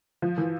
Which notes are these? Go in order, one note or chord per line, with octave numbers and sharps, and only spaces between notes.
F3
E3